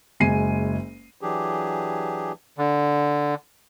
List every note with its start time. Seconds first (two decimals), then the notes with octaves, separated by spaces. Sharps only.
0.20 F#1 G#3 G#5 C7 D#7
1.21 E3 F#3 D4 G4 G#4
2.58 D3